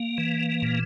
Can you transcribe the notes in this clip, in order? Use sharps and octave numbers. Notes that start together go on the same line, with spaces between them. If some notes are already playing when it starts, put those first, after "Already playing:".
Already playing: A#3
E3
A#2